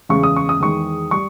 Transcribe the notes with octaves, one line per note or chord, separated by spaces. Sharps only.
E2 C#3 G#3 C#6
D#6
C#6
D#6
E2 D#3 G#3 C#6
G3 C#6